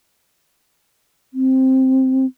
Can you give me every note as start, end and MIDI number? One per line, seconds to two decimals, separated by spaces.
1.34 2.26 60